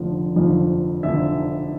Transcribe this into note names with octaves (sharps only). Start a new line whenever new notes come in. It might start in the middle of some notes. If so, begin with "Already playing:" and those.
Already playing: F1 D3 F3
F1 F2 D3 F3
F1 F2 D3 F3 E5